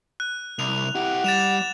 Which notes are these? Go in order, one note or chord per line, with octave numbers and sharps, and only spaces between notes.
F#6
C2 F7
E4 G4 F#5
G3 A6 E7 F7